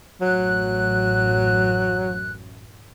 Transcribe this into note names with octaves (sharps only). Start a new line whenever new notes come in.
A1 F#2 A2 F#3 F#6